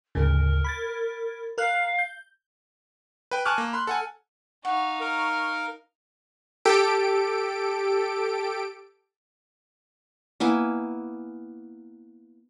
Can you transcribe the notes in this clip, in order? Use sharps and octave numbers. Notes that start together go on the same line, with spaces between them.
D2 G#2 C#3 A#4
B5 G#6 A6
A#4 F5 F6 F#6
G6
B4 G5
G#5 A5 C#6 D6 F6 F#6
A#3
B5 C6 F#6
A4 F#5 G#5
D#4 F5 F#5 C#6
A#4
G4 A4 D7
A#3 B3 E4 G#5